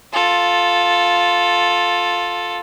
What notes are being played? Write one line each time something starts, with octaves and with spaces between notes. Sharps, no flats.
F4 A4